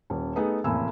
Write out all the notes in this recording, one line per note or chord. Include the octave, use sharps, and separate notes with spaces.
D#1 C#4
A3 B3 D#4 G#4
F1 E2 A2 A#3 G#5 E6